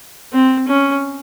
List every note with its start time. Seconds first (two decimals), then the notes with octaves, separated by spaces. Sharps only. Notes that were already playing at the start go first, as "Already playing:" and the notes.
0.33 C4
0.68 C#4